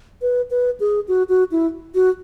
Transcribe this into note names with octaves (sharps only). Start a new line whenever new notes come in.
B4
B4
G#4
F#4
F#4
E4
F#4